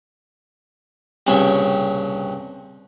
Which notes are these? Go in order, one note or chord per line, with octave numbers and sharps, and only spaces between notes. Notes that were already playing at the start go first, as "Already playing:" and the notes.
C2 G2 A#2 C#3 C#5 E5